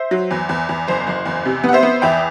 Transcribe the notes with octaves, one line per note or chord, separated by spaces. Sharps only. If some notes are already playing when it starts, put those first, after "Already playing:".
Already playing: C5 E5
F#3
E2
E2
E2
F#1 C5
F#1
E2
C3
B3
F#5
C5 E5
B3
E2 E5 G5